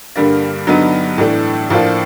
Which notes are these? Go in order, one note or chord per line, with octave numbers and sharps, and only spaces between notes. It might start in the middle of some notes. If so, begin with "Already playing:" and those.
G2 D3 G3 A#3
G2 D3 F#3 B3 D#4
A2 E3 A3 D4
A2 F3 A#3 D4 F4